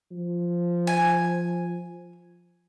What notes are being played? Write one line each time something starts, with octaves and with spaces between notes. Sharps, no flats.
F3
G#5